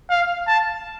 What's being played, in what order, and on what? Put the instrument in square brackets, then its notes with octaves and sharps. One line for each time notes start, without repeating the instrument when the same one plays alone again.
[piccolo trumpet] F5
A5